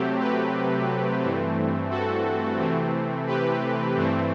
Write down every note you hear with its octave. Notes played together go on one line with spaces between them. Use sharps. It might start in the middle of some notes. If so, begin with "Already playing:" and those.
Already playing: C3 F#3 A3 C4 G4
G4 B4
G2 E3 A3 C4
F#4 A4
C3 E3 A3 C4
G4 B4
G2 E3 A3 C4